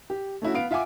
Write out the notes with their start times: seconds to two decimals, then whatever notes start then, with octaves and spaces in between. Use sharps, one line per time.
0.10 G4
0.42 A3 C#4 E4 F#4
0.54 B3 F5 D7
0.71 F4 E5 F#5 G#5 D6